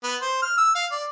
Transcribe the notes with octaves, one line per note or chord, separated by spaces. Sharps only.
B3
C5
F6
E6
F5
D5